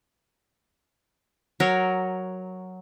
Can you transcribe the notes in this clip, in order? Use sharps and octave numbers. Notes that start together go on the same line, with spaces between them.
F#3 A#4 C#5